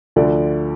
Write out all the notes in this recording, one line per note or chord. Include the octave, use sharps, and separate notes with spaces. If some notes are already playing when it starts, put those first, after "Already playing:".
D2 D3 F3 D5